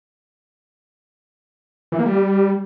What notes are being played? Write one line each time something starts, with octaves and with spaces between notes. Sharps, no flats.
E3
A#3
G3